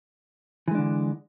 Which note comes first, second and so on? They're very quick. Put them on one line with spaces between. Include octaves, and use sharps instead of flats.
E3 G#3 D4 D3